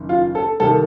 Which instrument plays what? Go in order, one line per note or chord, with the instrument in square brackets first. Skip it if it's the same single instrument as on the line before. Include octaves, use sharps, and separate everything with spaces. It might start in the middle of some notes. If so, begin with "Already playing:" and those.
Already playing: [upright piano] F#1 D#3
F4
A4
C2 C3 D#3 A4